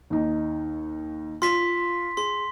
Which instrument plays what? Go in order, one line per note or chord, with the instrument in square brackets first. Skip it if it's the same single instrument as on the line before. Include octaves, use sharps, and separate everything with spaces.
[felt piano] D#2 D#4
[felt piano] F4 [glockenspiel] C6 B6
[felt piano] G#4 [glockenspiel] C6